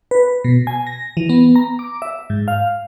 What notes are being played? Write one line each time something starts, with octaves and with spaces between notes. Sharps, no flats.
B4
B2
G#5
A#6
E3
B3
A#5
D6
E5
G#2
F5